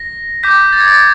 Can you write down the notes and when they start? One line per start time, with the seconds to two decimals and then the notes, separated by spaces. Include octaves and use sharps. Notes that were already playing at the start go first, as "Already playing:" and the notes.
Already playing: A#6
0.43 D6 G6 B6
0.72 A6
0.80 G#6
0.88 A6